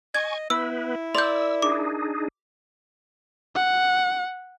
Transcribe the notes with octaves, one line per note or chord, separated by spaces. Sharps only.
D#5 G#5 C#6 G#6
B3 E4 B4 B5 E6
A#4 D5 C6 E6 G6
D4 D#4 G#4 D6
F#5